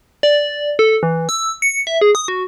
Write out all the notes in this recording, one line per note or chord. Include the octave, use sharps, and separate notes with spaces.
D5
A4
E3
E6
C#7
E5
G#4
D#6
F#4